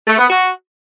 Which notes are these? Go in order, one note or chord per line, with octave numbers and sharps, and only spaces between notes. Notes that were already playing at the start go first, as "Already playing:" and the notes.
A3
B3
F#4